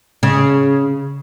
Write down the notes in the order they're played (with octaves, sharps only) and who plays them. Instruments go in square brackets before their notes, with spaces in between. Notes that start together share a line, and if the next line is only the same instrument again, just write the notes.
[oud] C#3